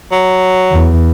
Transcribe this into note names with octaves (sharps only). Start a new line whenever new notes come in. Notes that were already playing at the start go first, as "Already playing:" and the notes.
F#3
E2